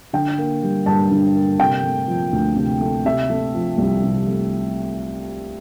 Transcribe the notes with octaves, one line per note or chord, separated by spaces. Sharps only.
D3 G5
A#3
G3
G2 A5
D3
A#3
C3 G5
A3
F3
D2
C3
A3
C3 E5
A3
F3
C2
C3
A3